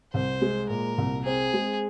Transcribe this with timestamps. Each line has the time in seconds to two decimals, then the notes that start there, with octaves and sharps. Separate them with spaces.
0.14 C2 C5
0.42 G#3
0.69 A#2 A#4
0.98 C2
1.25 C4 G#4
1.54 G#3